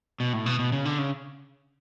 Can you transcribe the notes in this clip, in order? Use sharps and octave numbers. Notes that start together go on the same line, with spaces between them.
B2
A2
B2
B2
C#3
D3
C#3